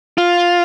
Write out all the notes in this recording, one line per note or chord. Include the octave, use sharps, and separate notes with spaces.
F4